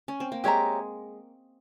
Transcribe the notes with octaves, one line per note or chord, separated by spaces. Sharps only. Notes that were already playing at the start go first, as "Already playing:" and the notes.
C#4
C4
A#3
G#3 G4 C#5 E5 A#5